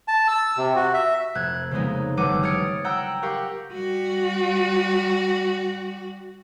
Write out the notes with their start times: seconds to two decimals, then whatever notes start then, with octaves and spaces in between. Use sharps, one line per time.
0.08 A5
0.28 E6
0.57 C3
0.76 F#4
0.94 E5
1.35 F1 F#6 G#6
1.71 C#3 F3 G#3 A#3 B3 D#4
2.17 G1 E3 F#3 F#5 D6 D#7
2.43 D#6 F6 G#6 A6 C#7 D7
2.84 F#5 G5 A#5 E6 D7
3.22 G4 A#4 F5 F#5 C#6
3.72 G3 F#4